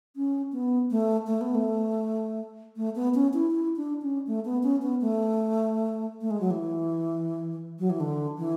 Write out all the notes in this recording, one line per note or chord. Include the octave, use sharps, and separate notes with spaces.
C#4
B3
A3
A3
B3
A3
A3
B3
C#4
E4
E4
D4
C#4
A3
B3
C#4
B3
A3
A3
G#3
F#3
E3
F#3
E3
D3
E3